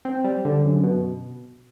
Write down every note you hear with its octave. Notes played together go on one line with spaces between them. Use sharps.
C4
G3
D3
F#2
B2